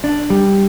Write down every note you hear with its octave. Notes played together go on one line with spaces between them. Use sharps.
D4
G3